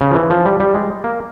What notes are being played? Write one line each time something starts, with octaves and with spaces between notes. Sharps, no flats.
C#3
F3
E3
F3
G3
G3
G#3
A#3